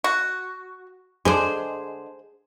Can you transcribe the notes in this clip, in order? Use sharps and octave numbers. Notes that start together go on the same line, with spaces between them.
F#4
D3 G#3 G#4 C5